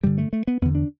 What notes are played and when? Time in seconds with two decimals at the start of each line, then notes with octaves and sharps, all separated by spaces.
0.03 G2 D3 G3
0.18 A3
0.33 A3
0.47 B3
0.62 E2 D3 B3
0.75 D4